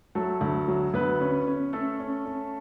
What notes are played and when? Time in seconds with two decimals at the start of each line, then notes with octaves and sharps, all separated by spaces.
0.15 F#3 A3 A4
0.41 D2
0.68 F#3
0.94 D2 B3 B4
1.21 C#4
1.47 C#4
1.73 A3 C#4 A4
2.00 C#4
2.26 C#4